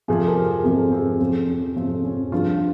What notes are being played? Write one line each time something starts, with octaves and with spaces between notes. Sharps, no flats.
F2 C3 F3 G#4
A#4
A#4
F2 C3 F3 G#4
C4
F2 C3 F3 C#4
C#4
F2 C3 F3 C4
C#4
G2 F3 F4